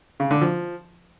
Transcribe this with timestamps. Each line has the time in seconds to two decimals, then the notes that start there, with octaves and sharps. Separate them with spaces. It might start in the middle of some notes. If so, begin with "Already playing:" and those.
0.20 C#3
0.31 D3
0.41 F3